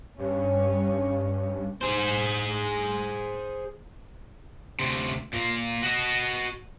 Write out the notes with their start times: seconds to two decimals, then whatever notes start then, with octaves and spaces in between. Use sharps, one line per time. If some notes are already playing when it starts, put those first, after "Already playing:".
0.18 G2 C#4
1.82 G#4 C5
4.80 D2 C3
5.33 A#2 A#3
5.83 F#4 D#5